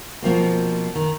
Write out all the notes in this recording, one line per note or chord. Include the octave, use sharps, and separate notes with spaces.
B2 F3 A#3 C4
D#3